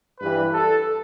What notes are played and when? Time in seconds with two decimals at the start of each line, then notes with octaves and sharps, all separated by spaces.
0.20 G2 E3 G3 B4
0.53 A4